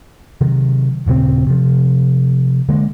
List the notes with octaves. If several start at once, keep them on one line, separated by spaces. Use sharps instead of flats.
C3 D#3 F#3
D#1 A#2 C#3 C4
C3 F3
D3 G#3 A#3